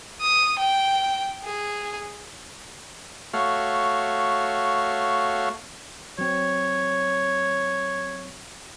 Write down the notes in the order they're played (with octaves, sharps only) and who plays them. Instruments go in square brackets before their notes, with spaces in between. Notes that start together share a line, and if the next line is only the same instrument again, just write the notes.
[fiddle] D#6
G5
G#4
[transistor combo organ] A3 F#4 C#5 F5
[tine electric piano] F#3 C4 [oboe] C#5